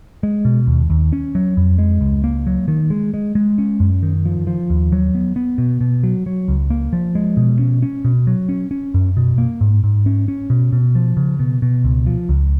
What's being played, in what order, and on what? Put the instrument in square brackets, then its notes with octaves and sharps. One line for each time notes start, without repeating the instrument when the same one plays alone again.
[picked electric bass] G#3
B2
D#2
D#2
C#4
F#3
F2
G#3
C#2
A#3
F#3
D#3
G#3
G#3
G#3
C#4
F#2
D#3
F3
F3
D#2
F#3
B3
B3
B2
B2
F#3
F#3
C#2
A#3
F3
G#3
B2
C#4
C#4
B2
F#3
C#4
C#4
F#2
B2
A#3
G#2
G#2
C#4
C#4
B2
B2
F3
C#3
B2
B2
C#2
F3
C#2